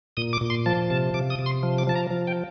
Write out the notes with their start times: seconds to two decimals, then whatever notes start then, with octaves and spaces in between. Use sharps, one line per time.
0.17 A#2 D#6
0.33 D6
0.41 A#2
0.50 C6
0.66 F3 A5
0.90 C3 A5
1.14 C3 D6
1.30 D#6
1.39 C3
1.46 C6
1.63 F3
1.78 D6
1.87 F3 A5
1.95 A#5
2.11 F3
2.27 G5